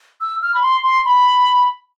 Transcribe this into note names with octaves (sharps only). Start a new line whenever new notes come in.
E6
F6
B5
C6
C6
B5